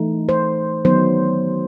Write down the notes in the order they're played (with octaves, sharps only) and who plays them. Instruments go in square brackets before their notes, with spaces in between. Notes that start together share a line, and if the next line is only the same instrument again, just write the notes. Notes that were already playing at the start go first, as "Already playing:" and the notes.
Already playing: [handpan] E3 A3 D#4
C5
D#3 F#3 B3 D#4 C5